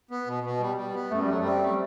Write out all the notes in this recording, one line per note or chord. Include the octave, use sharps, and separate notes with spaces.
B3
B2
B2
G3
G3
B3
F#2 A3
G3
F#3 A3
G3 C4
A3